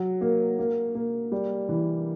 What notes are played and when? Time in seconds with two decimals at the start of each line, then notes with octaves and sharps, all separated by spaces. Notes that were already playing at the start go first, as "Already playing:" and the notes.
Already playing: F#3
0.21 A#3
0.59 A#3
0.95 A#3
1.32 G3
1.69 E3